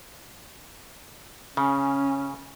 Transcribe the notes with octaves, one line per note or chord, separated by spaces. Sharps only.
C#3 C#4